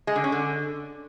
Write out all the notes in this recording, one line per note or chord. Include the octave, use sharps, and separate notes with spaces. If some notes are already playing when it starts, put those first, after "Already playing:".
G#3
D3
C#4
D3